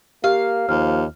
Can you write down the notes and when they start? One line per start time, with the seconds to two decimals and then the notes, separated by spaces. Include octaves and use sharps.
0.24 A#3 G4 F5
0.69 D#2 F3 F6